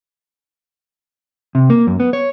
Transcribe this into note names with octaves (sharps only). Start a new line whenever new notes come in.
C3
A#3
F#2
B3
C#5